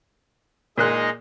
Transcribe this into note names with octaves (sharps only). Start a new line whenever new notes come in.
A#2 G#3 A#3 D#4 D#5 F#6